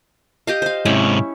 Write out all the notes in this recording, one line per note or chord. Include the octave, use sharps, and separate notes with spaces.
G4 D#5 F5
C5 F5
G#2 C3 C#4 E4